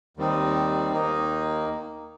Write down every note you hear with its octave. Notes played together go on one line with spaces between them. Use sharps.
D#2 D#3 G3 C4 D#4
D#2 D#3 A#3 D#4